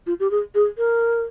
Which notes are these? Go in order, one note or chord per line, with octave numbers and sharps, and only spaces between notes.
F4
G4
G#4
G#4
A#4